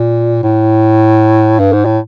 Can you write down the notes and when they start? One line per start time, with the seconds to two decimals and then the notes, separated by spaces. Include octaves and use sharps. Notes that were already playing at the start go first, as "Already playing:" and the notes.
Already playing: A#2
0.44 A2
1.59 G2
1.73 G#2
1.85 A2